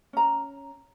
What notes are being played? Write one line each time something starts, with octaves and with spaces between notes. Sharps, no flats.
C#4 A#5